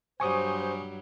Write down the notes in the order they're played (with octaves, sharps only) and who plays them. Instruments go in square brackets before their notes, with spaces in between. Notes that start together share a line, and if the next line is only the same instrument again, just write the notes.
[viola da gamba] G2 F#3 G3 [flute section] C5 [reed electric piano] G#5 C#6 D#6